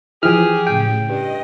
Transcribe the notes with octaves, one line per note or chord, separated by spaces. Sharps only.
E3 F3 G4 G#4 F6
A2 C#3 G5
G2 D#5